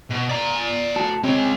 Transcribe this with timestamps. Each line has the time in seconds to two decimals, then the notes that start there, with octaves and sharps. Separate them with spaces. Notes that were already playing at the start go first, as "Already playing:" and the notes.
0.10 B2
0.29 D5 A#5
0.96 A2 F#4 A5
1.24 G#3 C4 C#5